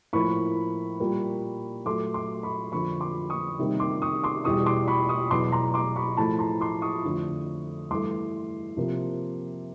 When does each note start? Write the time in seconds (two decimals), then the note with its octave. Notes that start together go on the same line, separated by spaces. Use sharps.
0.13 A2 F3 A#3 B5 C#6
1.00 A#2 G3 A#3
1.86 A#2 F#3 A3 C6 D6
2.14 C6 D6
2.43 B5 C#6
2.72 F2 D3 F3 A#3 B5 C#6
3.01 C6 D6
3.30 C#6 D#6
3.59 C3 D#3 G3 A#3
3.80 C6 D6
4.02 C#6 D#6
4.23 C6 D6
4.44 E2 B2 G3 C#6 D#6
4.66 C6 D6
4.88 B5 C#6
5.09 C#6 D#6
5.31 E2 B2 F#3 C6 D6
5.52 A#5 C6
5.74 C6 D6
5.96 B5 C#6
6.17 A2 F3 A3 A5 B5
6.39 A#5 C6
6.61 C6 D6
6.82 C#6 D#6
7.04 F2 D3 F3 A3
7.91 G2 E3 A3 C6 D6
8.77 C3 F3 A#3